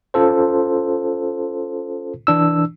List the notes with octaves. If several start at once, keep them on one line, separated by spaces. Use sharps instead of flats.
C#4 F4 A4 C5
E3 D4 E6